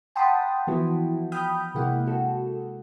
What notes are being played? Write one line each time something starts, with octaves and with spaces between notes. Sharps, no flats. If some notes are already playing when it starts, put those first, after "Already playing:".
F#5 G5 A5 B5 C6 D#6
E3 F3 B3 E4 F#4
G5 B5 D#6 F6 G6
C3 G#3 A#3 E4 F#5
F#4 A4